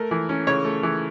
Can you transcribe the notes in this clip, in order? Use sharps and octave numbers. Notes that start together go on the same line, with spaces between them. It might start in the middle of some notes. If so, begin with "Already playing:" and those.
Already playing: A3 A#4
E3
C#4
C#3 C#5
A3
E3